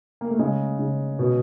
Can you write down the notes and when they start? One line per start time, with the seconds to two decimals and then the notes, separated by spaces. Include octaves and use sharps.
0.21 A#3
0.30 A3
0.39 C#3 G#3
0.79 C#3
1.19 B2